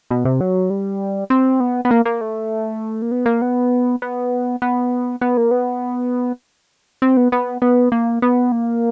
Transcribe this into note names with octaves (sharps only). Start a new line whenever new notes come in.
B2
C3
F#3
G3
C4
B3
B3
A#3
A#3
A3
A#3
B3
A#3
B3
B3
B3
B3
A#3
B3
C4
B3
B3
B3
A#3
B3
A#3